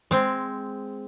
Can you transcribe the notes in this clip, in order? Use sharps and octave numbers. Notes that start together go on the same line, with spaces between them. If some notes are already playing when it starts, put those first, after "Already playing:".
G#3 C4